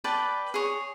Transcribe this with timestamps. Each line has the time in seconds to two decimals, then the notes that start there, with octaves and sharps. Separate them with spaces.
0.04 B4 D5 G5 A5
0.54 G#4 C#5